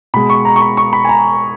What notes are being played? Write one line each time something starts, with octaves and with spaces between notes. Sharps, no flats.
B2 G#3 B5
C#6
A#5
C#6
B5
C#6
B5
G#5
A#5